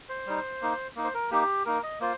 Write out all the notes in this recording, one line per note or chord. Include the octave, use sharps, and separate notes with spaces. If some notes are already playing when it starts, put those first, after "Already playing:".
C5
G3 D#4
A#3 D#4
A#3 D#4
C5
A#4
A#3 D#4 G4
A#3 D#4 A#4
D#5
A#3 F4 C5